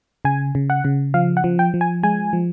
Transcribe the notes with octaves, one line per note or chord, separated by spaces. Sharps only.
C#3 G#5
C#3
F#5
C#3
F3 F5
F#5
F3
G5
F3
G#5
G#3 G#5
F3